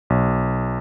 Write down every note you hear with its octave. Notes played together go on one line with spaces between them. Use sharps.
B1